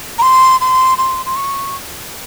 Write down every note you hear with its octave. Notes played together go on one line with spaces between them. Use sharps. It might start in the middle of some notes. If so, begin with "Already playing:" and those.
A#5
C6
C6
C6
C6
C#6